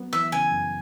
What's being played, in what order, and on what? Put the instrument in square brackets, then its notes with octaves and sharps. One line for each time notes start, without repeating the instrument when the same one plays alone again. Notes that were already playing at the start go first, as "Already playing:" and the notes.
Already playing: [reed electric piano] F#3 B3
[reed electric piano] E3 [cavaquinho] E5
[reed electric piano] C#3 [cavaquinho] G#5
[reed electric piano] F#2